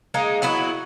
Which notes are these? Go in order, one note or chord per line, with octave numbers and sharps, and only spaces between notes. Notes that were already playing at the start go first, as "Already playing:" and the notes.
G#3 A#3 D#4
F#3 B3 E4 F#4